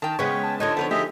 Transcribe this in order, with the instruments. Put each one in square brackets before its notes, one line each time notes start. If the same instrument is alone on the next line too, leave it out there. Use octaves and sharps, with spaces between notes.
[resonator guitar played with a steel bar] D#3 A#4 G5 [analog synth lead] A5
[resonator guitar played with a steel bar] C#3 B3 B4 [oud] G#3 C#4 [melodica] C#5 G5 [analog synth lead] C#6
[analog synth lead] A5
[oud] D3 F3 D#4 [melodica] C#5 D#5
[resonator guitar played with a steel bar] B3 A#4 C#5 [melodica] C5
[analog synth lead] A3 [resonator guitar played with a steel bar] G4 [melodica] G#4 D#5 E5